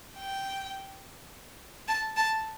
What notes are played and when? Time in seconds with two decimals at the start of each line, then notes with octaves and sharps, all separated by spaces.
0.18 G5
1.88 A5
2.17 A5